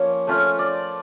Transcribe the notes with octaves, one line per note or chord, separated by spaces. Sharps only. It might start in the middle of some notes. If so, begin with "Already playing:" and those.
Already playing: F3 A#3 C#4 C#5
A3 C#4 F4
D5